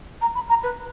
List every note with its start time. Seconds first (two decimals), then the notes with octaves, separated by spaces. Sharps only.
0.21 A#5
0.35 B5
0.49 A#5
0.63 B4